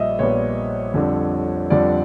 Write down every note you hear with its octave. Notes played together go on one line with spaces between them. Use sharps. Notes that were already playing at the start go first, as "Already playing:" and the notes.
Already playing: A#1 A#2 G3 D#5 E5
A#1 A#2 G3 B3 C#5
F2 D3 G3
F2 D3 G3 D5